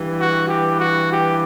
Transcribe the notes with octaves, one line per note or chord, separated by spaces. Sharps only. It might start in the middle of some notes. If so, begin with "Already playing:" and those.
Already playing: G2 E3
F#4
G4
F#4
G4